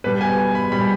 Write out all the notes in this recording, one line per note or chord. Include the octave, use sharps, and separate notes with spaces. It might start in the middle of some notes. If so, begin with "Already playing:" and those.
B2 G3 B4
G#5
B5
B2 G3 B5